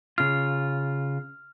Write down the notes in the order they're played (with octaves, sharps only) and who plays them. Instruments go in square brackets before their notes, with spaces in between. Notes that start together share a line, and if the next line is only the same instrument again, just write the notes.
[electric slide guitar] C#3 F4 [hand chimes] F6